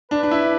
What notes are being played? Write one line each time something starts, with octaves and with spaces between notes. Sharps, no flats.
D4 B4
D4
E4